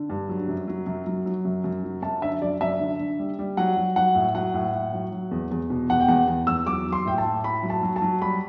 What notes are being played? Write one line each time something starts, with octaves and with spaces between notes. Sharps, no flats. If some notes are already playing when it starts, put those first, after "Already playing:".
Already playing: D3
G2
F#3
F#2
F#3
F#2
F#3
F#3
F#2
F#2
F#3
F#2 A5
D3 E5
F#2 D5
F#2 E5
D3
D3
G3
G3
F#3 F#5
F#3
F#3 F#5
A2
F#3 F#5
A2
A2
F#3
F#3
E2
E2
B2
E2 F#5
G5
E2 F#5
E2
E2 E6
F#3 D6
F#3
C6
A2 G5
A5
A2
A2 B5
F#3
A5
F#3
A5
F#3
G3 B5